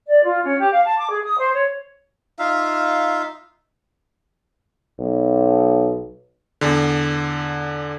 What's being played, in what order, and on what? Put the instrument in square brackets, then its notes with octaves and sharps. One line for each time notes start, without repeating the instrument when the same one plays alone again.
[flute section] D5
F4
C#4
G4
F5
A5
D6
G#4
D#6
C5
C#5
[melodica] D#4 F4 E5 F5
[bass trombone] B1
[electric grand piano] E2 D3